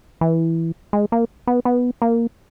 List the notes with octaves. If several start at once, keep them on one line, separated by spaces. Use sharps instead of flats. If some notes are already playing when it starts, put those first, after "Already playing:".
E3
G#3
A#3
B3
B3
A#3